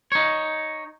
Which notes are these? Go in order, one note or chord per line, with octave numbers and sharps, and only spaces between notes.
D#4 C#5